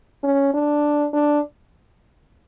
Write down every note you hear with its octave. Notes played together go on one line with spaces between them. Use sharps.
C#4
D4
D4